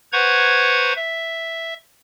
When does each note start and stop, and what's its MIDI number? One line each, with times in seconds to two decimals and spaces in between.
0.13 0.93 71
0.13 0.93 72
0.13 0.93 78
0.13 0.93 82
0.13 0.93 85
0.13 0.93 92
0.96 1.74 76